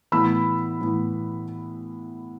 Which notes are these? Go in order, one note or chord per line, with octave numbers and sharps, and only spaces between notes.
A2 E3 B3 B5 E6
A2 E3 B3